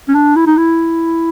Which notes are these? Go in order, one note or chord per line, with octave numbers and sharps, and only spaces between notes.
C#4
D4
E4
D#4
E4